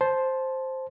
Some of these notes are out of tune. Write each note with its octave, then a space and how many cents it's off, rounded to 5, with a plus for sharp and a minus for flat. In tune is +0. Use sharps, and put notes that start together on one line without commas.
C5 +5 A5 -15